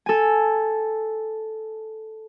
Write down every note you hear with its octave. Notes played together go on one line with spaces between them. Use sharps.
A4 G#5